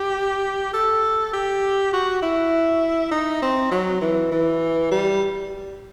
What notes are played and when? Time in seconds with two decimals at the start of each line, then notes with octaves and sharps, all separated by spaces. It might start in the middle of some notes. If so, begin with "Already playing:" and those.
Already playing: G4
0.73 A4
1.33 G4
1.93 F#4
2.22 E4
3.11 D#4
3.42 C4
3.71 F#3
4.01 E3
4.32 E3
4.91 G3